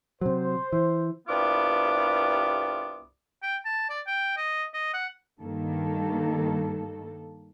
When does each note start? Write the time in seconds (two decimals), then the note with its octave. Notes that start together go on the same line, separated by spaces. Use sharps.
0.21 C3 F#3 C5
0.73 E3
1.28 C2 G2 B3 F4 D6
3.43 G5
3.65 A5
3.89 D5
4.07 G5
4.37 D#5
4.74 D#5
4.93 F#5
5.40 G2 D#3 A#3 A4